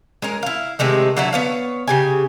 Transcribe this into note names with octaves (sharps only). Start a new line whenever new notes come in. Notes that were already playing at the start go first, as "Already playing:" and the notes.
G#3 C#4 A#4
E4 F5
C3 D#3 G#3 A3
D3 F#3 D#4 E4
B3 C#5 F5
C#3 G4 G#5